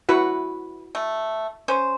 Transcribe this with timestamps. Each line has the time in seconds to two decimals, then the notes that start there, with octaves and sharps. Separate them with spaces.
0.09 E4 F#4 B4 F#5
0.95 A3
1.68 C#4 C5